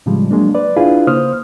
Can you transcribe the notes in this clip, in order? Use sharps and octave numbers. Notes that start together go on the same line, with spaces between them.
A2 C#3 F3 G3 G#3
F#3 G#3 A#3 D4
B4 D5
D4 E4 F4 G#4 B4 F5
C#3 A#3 C5 D#6 F6